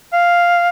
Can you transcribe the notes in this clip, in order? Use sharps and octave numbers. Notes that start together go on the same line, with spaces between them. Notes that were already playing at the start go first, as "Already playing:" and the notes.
F5